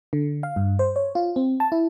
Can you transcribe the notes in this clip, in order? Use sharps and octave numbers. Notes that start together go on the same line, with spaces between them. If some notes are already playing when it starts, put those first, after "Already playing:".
D3
F5
G2
C5
C#5
F4
C4
A5
E4